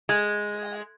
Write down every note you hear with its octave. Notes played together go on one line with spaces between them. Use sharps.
G#3